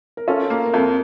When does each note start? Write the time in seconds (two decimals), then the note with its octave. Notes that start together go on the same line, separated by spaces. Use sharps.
0.17 A#4
0.28 C#4 F4 A4
0.50 A#3
0.66 A#4
0.73 F2 F4 A4